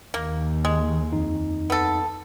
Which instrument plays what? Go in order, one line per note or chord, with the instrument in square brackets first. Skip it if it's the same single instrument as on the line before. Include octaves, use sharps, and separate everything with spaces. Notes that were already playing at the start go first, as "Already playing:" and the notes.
[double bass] D#2 [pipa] A#3
[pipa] G#3
[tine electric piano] F2 D#4
[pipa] B3 A4